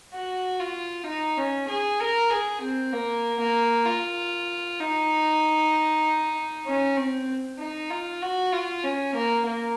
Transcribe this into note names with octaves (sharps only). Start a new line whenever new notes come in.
F#4
F4
D#4
C#4
G#4
A#4
G#4
C4
A#3
A#3
F4
D#4
C#4
C4
D#4
F4
F#4
F4
C#4
A#3
A#3